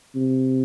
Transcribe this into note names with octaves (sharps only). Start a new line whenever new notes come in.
C3